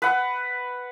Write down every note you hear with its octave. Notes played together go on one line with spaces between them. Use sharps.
B4 F#5